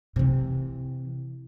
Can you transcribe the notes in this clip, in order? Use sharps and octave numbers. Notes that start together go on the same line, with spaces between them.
C3 E3